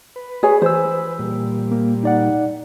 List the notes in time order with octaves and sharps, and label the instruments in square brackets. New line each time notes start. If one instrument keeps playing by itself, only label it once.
[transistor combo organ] B4
[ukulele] G#4 C#5 G#5
[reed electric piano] E3 E6 [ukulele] C5
[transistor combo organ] A#2 G3
[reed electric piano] A#3
D#4 D5 F#5